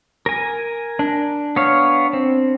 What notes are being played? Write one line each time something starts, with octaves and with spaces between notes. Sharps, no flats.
A#4 G#5
D4
B3 C#5 F5
C4